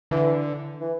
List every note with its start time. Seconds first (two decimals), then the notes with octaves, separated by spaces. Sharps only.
0.11 D3 E3
0.81 E3